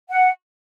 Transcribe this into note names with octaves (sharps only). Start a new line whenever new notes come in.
F#5